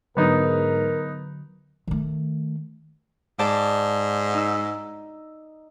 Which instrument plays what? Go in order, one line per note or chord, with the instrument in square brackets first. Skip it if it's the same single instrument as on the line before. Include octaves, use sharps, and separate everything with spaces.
[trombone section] G#2 [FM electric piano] D3 F#3 [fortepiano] B3 D#4 [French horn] A#4
[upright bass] D#3 A3
[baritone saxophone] G#2 [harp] D5 A5
[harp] D#4 E6